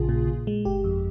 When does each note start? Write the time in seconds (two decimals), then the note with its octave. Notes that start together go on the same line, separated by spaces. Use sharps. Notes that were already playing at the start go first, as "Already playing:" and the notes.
Already playing: A#1 C#3 F4 G#4
0.09 A#2
0.28 A#2
0.47 G#3
0.65 G1 G4
0.84 F2